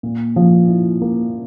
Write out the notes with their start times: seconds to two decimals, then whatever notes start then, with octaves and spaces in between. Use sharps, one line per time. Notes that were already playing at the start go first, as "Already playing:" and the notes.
0.03 A#2
0.36 F3
0.69 E4
1.01 A#3